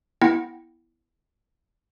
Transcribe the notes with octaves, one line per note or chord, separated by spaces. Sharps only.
B3 E4 F#5 G5